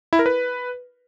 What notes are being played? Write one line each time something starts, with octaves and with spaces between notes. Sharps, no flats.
E4
A#4
B4